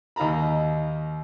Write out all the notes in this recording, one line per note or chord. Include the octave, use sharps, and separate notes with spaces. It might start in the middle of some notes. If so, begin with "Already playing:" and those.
D#2 D#4 F5 A#5 B5